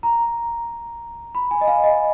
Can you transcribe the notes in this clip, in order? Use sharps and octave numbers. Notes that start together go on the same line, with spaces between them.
A#5
B5
G#5
D#5
F5
D#5